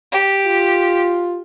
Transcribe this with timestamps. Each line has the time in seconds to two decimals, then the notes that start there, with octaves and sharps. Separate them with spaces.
0.12 G4
0.46 F4